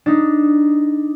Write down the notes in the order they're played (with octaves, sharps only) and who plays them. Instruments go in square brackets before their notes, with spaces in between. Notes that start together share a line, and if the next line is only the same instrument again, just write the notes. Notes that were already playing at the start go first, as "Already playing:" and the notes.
[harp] D4 D#4